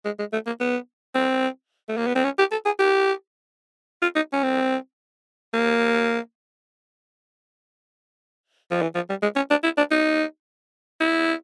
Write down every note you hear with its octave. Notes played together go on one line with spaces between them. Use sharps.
G#3
G#3
A3
A#3
B3
C4
A3
A#3
B3
C4
C#4
G4
A4
G#4
G4
F4
D#4
C#4
C4
A#3
F3
E3
F3
G3
G#3
C#4
D4
E4
D4
D#4
E4